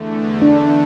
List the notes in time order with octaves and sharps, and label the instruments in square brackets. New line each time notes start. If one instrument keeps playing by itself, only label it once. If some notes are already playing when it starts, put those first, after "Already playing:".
Already playing: [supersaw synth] E2 D3 A3
[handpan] D4